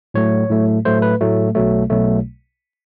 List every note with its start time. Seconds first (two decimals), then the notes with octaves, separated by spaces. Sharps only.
0.14 A2 F#3 A3 C#5
0.49 A2 F#3 A3
0.85 A2 F#3 A3 C5
1.02 B4
1.21 A2 F#3 A3
1.55 B1 B2 F#3 A3
1.90 B1 B2 F#3 A3